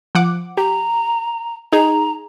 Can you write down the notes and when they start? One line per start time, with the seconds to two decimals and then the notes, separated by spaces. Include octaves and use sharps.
0.15 F3 F#5 D6
0.57 G4 A#5
1.73 D#4 G#4 A#5